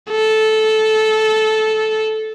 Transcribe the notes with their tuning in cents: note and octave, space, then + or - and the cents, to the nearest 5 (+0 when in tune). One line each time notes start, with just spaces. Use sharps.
A4 -15